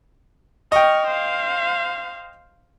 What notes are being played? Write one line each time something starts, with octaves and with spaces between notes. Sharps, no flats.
D#5 G5 C#6 F6
C5 F5